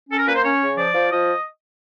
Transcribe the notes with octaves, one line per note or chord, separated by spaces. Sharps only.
C#4 A4
A#4
A#3 B4
C5
C#4 C#5
C#3
F3 D5
F3
F3 D#5